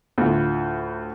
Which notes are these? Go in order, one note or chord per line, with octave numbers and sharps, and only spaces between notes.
D2 A2 F4